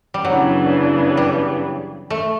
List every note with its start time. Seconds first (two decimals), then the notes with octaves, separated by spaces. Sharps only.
0.14 G3
0.24 F#2 C#3 E3 F#3 B3 D4
1.17 G3
2.10 A3